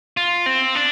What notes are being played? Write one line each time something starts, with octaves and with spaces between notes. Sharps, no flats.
F4
C4
D4